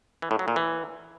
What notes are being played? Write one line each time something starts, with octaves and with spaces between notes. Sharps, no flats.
E3
A2
F#3
A#2
E3